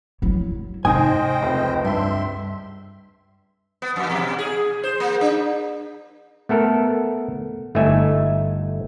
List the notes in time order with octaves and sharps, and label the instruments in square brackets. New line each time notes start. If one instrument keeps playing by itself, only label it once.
[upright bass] F#3 E4
[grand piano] G#2 D#3 D#6 [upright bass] C3 [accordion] C5 D#5 G5 [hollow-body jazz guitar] G#5
[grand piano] F1 C#2 B4
[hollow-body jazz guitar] G2 [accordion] E5 C6
[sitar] B3
F2
B2
G#4
C5
A#3
D4
[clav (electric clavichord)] A3 B3 A4 A#4
G1 A3 D#4 E4 E5 G#5